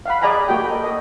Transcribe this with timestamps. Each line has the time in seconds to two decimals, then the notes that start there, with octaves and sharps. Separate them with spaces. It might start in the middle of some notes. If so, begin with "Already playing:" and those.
0.06 F5 F#5 B5
0.22 G#4 D5 D#5 G#5 A#5 B5
0.48 A#3 F#4 G4 G5
0.68 A4 A#4 D#5
0.84 D#5